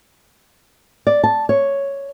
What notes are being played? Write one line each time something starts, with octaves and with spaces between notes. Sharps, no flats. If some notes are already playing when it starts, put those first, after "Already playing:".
D5
A5
C#5